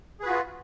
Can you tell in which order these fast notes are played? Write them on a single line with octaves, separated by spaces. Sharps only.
G#4 B4 F#4 F4